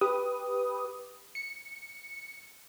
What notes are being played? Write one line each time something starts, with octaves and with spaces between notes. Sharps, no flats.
G4 B4 D#6
C#7